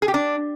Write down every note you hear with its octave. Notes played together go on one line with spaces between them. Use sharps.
G#4
G4
D4